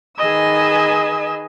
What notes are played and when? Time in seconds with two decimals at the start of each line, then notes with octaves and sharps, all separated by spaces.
0.17 D#3 G#4 B4 D#5 G#5 E6